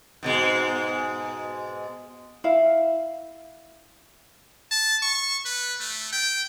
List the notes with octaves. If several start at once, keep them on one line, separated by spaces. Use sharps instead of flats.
G#2 B2 G#3
E4 F5
A5
C#6
B4
A3
G5